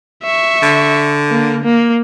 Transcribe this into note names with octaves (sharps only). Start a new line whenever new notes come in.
E5 C#6
D3
A#3
A#3